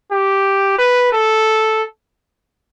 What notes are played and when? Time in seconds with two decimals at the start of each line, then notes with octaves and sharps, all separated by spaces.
0.11 G4
0.78 B4
1.12 A4